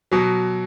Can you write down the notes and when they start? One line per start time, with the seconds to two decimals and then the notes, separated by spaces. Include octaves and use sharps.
0.12 B2 F#3